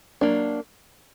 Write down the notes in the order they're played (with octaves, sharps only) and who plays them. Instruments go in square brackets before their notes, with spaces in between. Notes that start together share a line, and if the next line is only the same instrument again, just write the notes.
[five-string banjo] F#3 A#3 D4